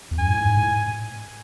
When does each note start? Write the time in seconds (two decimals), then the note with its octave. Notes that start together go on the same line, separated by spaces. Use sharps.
0.11 E2
0.19 F#2 G#5
0.29 A2
0.38 G#2
0.57 A2